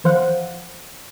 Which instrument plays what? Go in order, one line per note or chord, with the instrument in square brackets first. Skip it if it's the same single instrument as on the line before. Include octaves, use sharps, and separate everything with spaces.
[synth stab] E2 F3 C5 F5 F#5